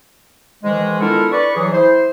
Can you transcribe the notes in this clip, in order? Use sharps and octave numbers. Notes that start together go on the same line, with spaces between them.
G#2 D#3 E3 G#3
B3 D4 E4 F4 A4 A#4
B4 D5 C#6
E3 F#3 G#4
E4 C5